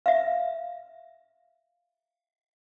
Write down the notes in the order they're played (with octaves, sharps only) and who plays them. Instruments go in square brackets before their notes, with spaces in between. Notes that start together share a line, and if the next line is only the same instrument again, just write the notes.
[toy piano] E5 F5